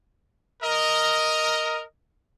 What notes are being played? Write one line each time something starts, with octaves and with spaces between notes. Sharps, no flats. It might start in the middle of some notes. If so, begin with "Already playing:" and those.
A#4 D#5